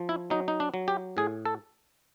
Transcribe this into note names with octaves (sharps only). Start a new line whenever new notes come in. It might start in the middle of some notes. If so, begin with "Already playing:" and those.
Already playing: F3
E4
F#3 D#4
D#4
D4
F#3
G4
A2 G#4
A4